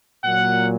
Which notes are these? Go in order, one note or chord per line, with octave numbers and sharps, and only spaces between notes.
A#2 F#3 F#5